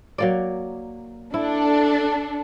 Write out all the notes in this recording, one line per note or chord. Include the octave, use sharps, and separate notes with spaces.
F#3 A#3 D5
D4 E4 A4